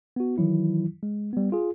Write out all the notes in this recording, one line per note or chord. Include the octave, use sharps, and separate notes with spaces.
B3 F#4
D#3 E3 F#3 E4
G#3
G3 B3
F4 G#4